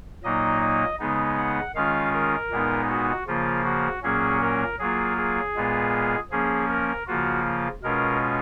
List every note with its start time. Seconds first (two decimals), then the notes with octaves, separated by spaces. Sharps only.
0.23 A#2 F#3 A#3 D#4 D#5
0.61 D#5
0.99 C#3 G#3 B3 D#4
1.37 F#5
1.75 D#3 G#3 C#4 F4 F5
2.13 A#4
2.50 A#2 G#3 B3 D#4
2.89 F#4
3.27 C#3 F3 A#3 F4
3.65 F#4
4.03 A#2 F#3 A#3 C#4 G#4
4.41 A#4
4.79 F#3 A#3 F4 G#4
5.17 G#4
5.55 A#2 G#3 B3 F4
6.31 F3 A#3 C#4 G#4
6.69 A#4
7.07 C#3 F3 A#3 F4 F#4
7.83 B2 G#3 C#4 F4 A#4